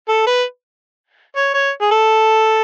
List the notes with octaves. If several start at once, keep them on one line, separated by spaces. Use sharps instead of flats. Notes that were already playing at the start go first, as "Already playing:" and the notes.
A4
B4
C#5
C#5
G#4
A4